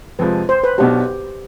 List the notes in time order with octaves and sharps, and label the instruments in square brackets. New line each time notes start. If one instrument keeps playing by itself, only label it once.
[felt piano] F2 C3 F3 G#3 [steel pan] B4
[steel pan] C5
B4
[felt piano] B1 B2 B3 D4 [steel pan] G4